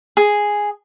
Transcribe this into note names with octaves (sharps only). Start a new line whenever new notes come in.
G#4